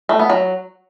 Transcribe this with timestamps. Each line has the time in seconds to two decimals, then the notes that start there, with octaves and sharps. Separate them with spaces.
0.09 A3
0.19 B3
0.30 F#3